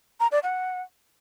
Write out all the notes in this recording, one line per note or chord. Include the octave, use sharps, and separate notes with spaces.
A#5
D5
F#5